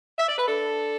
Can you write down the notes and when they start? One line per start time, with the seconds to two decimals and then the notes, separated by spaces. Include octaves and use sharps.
0.19 E5
0.28 D5
0.38 B4
0.47 D4 A4